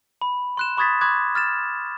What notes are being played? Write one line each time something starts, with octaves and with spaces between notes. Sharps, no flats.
B5
C6 F#6 E7
B5 C#6 D#6 G#6 A6 B6
B5 C6 D6 F#6 G#6
F6 A6 E7